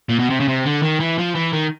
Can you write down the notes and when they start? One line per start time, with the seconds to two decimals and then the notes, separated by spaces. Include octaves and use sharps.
0.09 A#2
0.19 B2
0.30 C3
0.40 C#3
0.48 C3
0.66 D3
0.82 D#3
1.00 E3
1.18 F3
1.35 E3
1.53 D#3